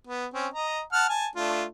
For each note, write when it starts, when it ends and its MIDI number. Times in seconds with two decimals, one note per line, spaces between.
0.07 0.26 59
0.34 0.47 60
0.34 0.47 61
0.54 0.82 75
0.54 0.82 82
0.92 1.07 78
0.92 1.07 81
0.92 1.07 89
1.09 1.27 80
1.09 1.27 81
1.35 1.64 57
1.35 1.64 62
1.35 1.64 65